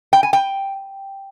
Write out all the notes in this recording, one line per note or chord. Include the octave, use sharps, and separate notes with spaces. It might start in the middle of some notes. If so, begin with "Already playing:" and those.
G5
G#5
G5